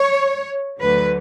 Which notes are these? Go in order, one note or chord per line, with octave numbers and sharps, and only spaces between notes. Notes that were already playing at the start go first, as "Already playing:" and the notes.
Already playing: C#5
D2 D3 F#3 B4